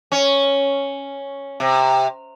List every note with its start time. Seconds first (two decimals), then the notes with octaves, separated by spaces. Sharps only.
0.12 C#4
1.60 C3